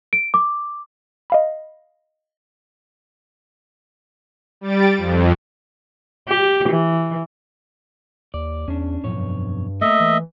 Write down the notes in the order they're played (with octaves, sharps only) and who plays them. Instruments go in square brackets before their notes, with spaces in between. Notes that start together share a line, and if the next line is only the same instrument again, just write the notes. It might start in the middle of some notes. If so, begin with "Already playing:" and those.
[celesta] D7
D6
[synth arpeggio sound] D#5 F5 B5
[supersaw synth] G3 A6 D7
F2
[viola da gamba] G4
E3
[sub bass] D#2 [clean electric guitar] D5
[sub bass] E2 [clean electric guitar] C#4 D4
[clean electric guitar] B1 F2 C#5 [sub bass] A2
[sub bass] G2
[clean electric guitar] A3 A#3 A#4 [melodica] D#5 E5
[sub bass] E3